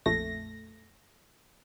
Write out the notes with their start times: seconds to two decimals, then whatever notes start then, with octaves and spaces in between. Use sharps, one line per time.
0.06 A#1 F2 A3 A#6